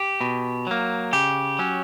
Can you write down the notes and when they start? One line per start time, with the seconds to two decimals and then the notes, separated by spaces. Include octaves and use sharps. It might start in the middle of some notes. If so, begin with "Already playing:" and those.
Already playing: G4
0.21 B2
0.67 F#3 A#3
1.13 C#3 G4
1.59 F#3 C#4